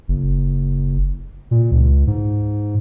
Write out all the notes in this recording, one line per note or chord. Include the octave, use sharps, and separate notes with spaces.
F#1
A#2
C#2
G#2